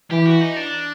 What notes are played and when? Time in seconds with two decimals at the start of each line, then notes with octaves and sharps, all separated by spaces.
0.11 E3 G4
0.26 F#4
0.41 D#4
0.56 D4